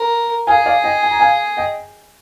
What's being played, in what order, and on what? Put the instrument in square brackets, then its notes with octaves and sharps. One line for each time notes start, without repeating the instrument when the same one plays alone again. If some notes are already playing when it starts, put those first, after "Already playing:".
Already playing: [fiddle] A#4
[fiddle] G#4 [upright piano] F5 G#5
[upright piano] D5 F5
D#5 G5
G#5
A#5
F5 G#5
D#5 G5